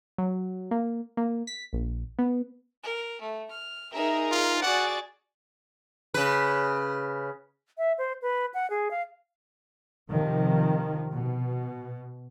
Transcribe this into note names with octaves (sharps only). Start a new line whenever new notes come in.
F#3
A#3
A#3
B6
A#1
B3
A#4
A3
F6
D#4 G#4 A#4 E5
F4 A#5
F#4 G#4 D5 F#5 D6 A6
C#3 B4
E5
C5
B4
F#5
G#4
F5
C3 D#3 F3
B2